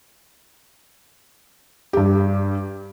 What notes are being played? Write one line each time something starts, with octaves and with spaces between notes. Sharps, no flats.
G2 G4